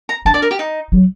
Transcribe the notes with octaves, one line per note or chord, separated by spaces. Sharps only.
A#5
D4 A5
D5
A#4
G4
D#4
F#3